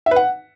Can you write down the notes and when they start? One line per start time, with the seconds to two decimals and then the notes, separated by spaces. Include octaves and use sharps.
0.06 E5
0.11 B4
0.16 F#5